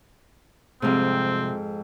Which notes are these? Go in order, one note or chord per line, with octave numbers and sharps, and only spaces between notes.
F2 G#2 C3 F3 G3 C4